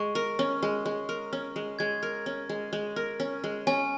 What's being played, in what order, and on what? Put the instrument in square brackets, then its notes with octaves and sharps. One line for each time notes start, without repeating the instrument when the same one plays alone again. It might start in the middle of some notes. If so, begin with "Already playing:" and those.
Already playing: [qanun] G#3 [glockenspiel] C#6
[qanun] A#4
C#4
G#3
G#3
A#4
C#4
G#3
[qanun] G#3 [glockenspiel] G#6
[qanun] A#4
C#4
G#3
G#3
A#4
C#4
G#3
[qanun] C#4 [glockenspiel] G#5